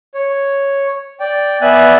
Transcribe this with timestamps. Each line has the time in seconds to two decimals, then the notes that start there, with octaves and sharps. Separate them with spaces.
0.14 C#5
1.20 D5 G5
1.62 B3 D5 E5 G#5 F#6